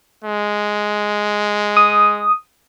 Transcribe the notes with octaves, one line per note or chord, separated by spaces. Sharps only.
G#3
D#6